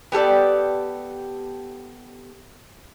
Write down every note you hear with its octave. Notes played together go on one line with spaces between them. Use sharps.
B3 G4 A4 D5